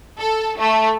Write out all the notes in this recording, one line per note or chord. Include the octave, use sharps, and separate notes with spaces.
A4
A3